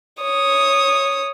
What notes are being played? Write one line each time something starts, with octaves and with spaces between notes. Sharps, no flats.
C#5 D#6